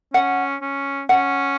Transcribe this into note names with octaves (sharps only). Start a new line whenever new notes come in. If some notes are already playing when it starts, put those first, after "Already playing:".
C#4 F#5
C#4
C#4 F#5